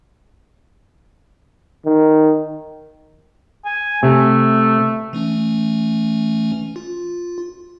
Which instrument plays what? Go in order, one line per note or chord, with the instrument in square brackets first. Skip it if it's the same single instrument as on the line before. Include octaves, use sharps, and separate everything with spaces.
[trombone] D#3
[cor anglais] G#5
[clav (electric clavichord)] C3 [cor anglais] A3
[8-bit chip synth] E3 A3 C#4
F4